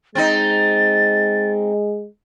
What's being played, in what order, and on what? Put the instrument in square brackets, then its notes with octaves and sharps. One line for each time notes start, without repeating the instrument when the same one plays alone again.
[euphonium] G#3 [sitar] C4 D#4 [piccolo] A6